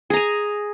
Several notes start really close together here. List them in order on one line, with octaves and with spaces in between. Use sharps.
G#4 A#5 G#5